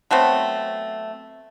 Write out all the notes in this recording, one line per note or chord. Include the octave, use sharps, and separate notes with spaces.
F#3 A3 B3 C4